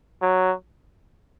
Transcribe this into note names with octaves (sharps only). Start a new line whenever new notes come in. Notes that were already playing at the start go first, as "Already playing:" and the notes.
F#3